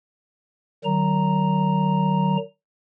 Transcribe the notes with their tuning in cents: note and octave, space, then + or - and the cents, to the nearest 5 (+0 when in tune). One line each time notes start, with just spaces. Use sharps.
D#3 -25 F#3 +40 A#5 +0